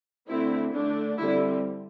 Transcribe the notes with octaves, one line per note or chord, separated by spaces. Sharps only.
D3 A3 C4 E4
D3 A3 D4
D3 G3 C4 E4